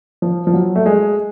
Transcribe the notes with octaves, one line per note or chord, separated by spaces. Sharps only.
F3
F3
F#3
A3
G#3